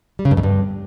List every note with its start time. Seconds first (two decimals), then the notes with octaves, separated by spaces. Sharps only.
0.19 G3
0.25 C#3
0.31 G2
0.37 F2
0.43 G2